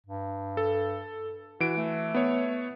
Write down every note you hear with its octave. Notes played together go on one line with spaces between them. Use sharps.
G2
A4
E3 F#4 D7
A3
B3 C#5